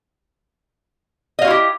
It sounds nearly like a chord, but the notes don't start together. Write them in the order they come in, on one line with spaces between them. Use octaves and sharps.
D#5 F5 F#4 E4 G4